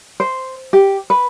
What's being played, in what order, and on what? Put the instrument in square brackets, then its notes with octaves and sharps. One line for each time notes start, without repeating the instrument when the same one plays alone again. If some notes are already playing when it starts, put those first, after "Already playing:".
[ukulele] C5
G4
B4